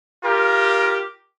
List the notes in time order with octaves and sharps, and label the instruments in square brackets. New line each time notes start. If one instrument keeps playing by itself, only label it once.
[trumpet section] F4 G4 A#4